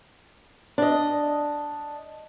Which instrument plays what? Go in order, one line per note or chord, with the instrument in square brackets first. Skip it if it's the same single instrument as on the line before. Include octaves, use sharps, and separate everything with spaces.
[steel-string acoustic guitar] D4 D#5